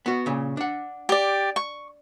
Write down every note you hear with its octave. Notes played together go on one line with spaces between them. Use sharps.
B3 F#4
A#2 C#3
D4 F#5
G4 D5
C#6